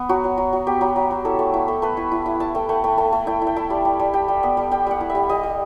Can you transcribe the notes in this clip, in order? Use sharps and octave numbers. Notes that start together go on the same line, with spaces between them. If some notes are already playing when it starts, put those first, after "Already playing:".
Already playing: B3
F#3 F#4
F#3
F#3
F#3
B3 G4
F#3
F#3
F#3
E4 A4
A3
E4
A3
A3 B4
E4
E4
E4
E4 A5
A3 G5
A3 F#5
A3 G5
A3 A5
A3
E4 G5
E4
G5
E4 A5
G3
G3
G3
G3 G5
G3
B3
G3
G3 G5
G3 F#5
E4
E5
G3
G3 D#5
G3